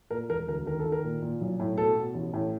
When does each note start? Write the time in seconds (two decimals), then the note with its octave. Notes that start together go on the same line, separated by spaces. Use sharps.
0.10 A#2 A#4
0.29 E1 A#4
0.47 D2 A#4
0.66 D#3 A#4
0.79 A4
0.85 D#3
0.92 A#4
1.04 A#2
1.22 A#2
1.41 B1
1.60 A2
1.77 B2 A4
1.96 B2
2.14 A1
2.34 A2